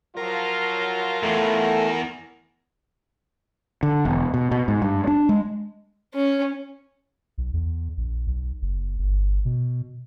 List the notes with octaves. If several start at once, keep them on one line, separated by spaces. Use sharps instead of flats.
F3 F#3 F4 A#4
E2 A3
D3
E1
B2
B2
G#2
G2
D4
G#3
C#4
B1
E2
A#1
B1
F#1
G1
B2